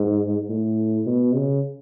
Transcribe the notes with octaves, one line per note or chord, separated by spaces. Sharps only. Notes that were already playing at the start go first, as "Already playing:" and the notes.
Already playing: G#2
A2
B2
C#3